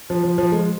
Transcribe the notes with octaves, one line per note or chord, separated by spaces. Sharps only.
F3
F3
F3
G#3